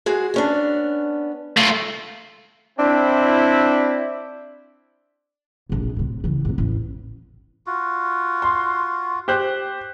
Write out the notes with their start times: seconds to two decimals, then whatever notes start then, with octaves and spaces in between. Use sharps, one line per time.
0.06 G#3 F#4 G#4
0.34 B3 C#4 D4
1.57 A3 F4
2.79 C4 D4 E4
5.69 F1 A#1
5.96 A2 C3
6.24 C#3 E3
6.45 F2 A#2
6.58 A1 E2
7.67 F4 F#4
8.42 C6
9.28 G4 C5 F#6